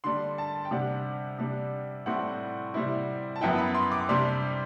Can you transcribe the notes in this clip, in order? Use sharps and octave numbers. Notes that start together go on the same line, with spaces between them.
D3 G3 D4 C6
A5
G5
C3 G3 D4 F#5
C3 G3 D4
A2 G3 C4 E4 F#5
C3 G3 C4 E4
A5
F#2 F#3 B3 E4 G5
B5
C6
D6
C3 G3 D4 C6